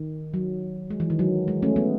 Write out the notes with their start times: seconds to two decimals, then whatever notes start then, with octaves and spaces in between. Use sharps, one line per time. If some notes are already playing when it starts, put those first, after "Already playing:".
Already playing: D#3
0.34 F#3
0.90 G#3
1.00 E3
1.10 D#3
1.19 F#3
1.48 G#3
1.63 A3 C#4
1.76 G#3 B3